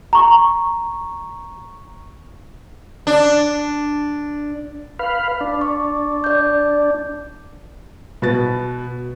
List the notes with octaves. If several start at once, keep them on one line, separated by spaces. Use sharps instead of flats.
A#5 C#6
D4
B4 F5
D4
C#6
D5 G6
B2 B4 A6